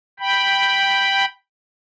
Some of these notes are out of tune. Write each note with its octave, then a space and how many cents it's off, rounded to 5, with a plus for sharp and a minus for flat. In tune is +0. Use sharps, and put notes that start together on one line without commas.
G5 +0 B5 +0